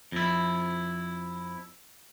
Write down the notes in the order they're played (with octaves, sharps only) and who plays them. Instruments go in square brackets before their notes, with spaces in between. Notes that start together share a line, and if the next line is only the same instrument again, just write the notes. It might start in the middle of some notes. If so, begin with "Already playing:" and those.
[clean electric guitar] F2 E4